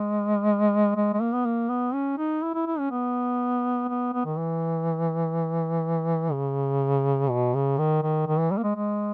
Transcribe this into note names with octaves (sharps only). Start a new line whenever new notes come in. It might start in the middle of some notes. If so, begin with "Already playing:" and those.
Already playing: G#3
G#3
G#3
A#3
B3
A#3
B3
C#4
D#4
E4
E4
E4
C#4
B3
B3
B3
D#3
E3
C#3
B2
C#3
D#3
D#3
D#3
E3
G3
A#3
G#3
G#3